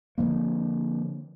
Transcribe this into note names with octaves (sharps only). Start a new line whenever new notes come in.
D3 F3 A#3